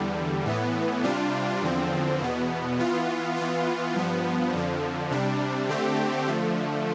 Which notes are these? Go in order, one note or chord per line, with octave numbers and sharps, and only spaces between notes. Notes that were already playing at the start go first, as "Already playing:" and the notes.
Already playing: E2 D3 G3
A2 E3 B3
C3 G3 D4 F4
E2 D3 F3 C4
E2 B2 B3
E3 B3 F4
E3 B3 F4
G2 F3 B3
F2 D3 F3
C3 G3 D4
D3 A3 C4 G4
D3 F3 A3